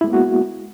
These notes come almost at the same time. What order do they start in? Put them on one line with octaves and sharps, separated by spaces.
E4 G#3 B3 A#3 F#4